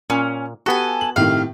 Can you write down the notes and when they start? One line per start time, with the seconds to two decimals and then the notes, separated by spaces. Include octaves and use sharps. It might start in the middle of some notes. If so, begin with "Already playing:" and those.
0.10 A#2 C#4
0.66 B3 F#4 G4 A4 G#5
1.01 F#7
1.16 A2 C3 D#3 F5